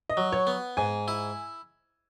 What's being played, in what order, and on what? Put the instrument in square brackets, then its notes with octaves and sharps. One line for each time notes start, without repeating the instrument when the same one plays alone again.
[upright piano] D#5
[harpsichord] F#3
[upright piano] C#5
[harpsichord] B3
[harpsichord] G#2 [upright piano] G#5
[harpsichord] E4